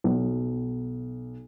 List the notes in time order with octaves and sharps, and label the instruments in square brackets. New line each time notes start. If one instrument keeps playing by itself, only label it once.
[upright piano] B1